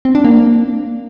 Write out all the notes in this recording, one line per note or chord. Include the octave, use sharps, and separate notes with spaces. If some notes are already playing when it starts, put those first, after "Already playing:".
C4
D4
A#3